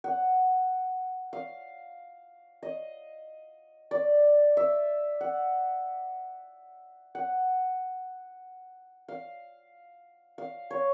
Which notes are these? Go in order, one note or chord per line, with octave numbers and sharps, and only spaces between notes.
F#5
F5
D#5
D5
E5
F#5
F#5
F5
F5
C#5